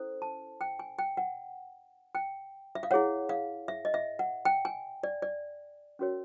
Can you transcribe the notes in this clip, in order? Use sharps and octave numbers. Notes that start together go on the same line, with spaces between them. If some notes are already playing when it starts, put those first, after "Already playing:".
Already playing: C#4 E4 A4 C5
A5
G5
G#5
G5
F#5
G5
E5
F5
E4 G#4 C#5 F#5
F5
E5
D#5
E5
F#5
G5
G#5
D5
D5
C#4 F#4 A#4 C#5